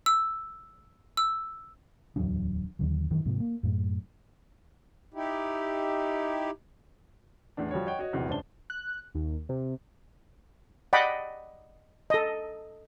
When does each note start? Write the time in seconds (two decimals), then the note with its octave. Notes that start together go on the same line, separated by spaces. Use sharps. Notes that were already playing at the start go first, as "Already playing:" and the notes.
0.06 E6
1.17 E6
2.16 D1 E2 F#3 D4
2.79 D#2 D3 F#3
3.10 F#2 D#3 E3
3.25 G#2 C3 F3
3.40 A#3
3.63 F#2 A2
5.14 D#4 E4 G4
7.57 E2 A2 E3 D4
7.71 F3 G3 F#4 C#5
7.87 C#5 D#5 F#5 G5
7.99 F#4 C#5 D#5
8.13 A#1 E2 C3 F#3
8.28 C#2 F#2 D4 C5 A5 G7
8.70 F#6
9.15 D#2
9.49 C3
10.93 D5 D#5 F#5 G5 B5
12.10 A4 D#5